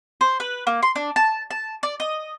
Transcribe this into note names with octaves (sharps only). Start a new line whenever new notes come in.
C5
B4
A#3
C6
D4
A5
A5
D5
D#5